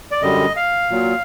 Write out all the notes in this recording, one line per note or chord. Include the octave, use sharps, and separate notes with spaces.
D5
F#2 D3 G3 D#5
F5
A#2 F#3